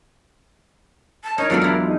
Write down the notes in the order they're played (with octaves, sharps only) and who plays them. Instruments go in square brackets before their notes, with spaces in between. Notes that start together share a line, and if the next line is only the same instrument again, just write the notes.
[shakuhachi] A5
[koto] D#4 [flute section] A#4 A#5 F6 [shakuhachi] C#5
[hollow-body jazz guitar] E2 F#3 G#3 [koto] D4 A4 D5 [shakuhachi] F4
[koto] D4 E4
[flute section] D#4